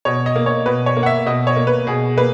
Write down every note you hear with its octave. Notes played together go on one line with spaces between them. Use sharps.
B2 C#5
D#5
A#3
C#5
B2 B4
C#5
A#3
F#5
E5
B2 D#5
C#5
A#3
B4
B2 G#4
A#3 B4